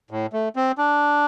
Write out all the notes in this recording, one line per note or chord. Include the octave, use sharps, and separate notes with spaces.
A2
A3
C4
D4